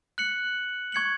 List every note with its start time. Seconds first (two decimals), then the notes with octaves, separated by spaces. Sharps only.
0.18 F#6 C#7 F#7
0.92 C#6 G#6 C#7 F#7